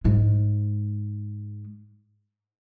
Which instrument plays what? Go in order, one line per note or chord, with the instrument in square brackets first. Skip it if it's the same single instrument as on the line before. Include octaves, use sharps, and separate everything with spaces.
[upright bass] G#2 G#3